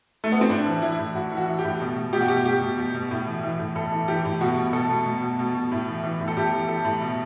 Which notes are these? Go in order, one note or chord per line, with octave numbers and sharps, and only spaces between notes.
A3
B3
C4
A2 D4
E3
E3 E4
A2
A2 F#4
E3
F#4
E3
G4
A2
B2
B2
B2 G4
F#4
B2 G4
B2 G4
B2
B2
B2
A2
E3
E3
A2
A2 A4
E3
E3 G4
A2
B2 F#4
B2
B2 A4
B2
B2
B2
B2
B2
A2
E3
E3
A2
A4
A2 G4
E3
E3 A4
A2
B2